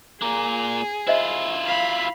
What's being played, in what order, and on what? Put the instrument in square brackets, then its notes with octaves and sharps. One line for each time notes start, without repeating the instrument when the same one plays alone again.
[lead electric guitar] A#2 A#3 [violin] G#4 [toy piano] A#5
[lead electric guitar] E4 F4 [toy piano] C5 D#5 E5
[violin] F5 B5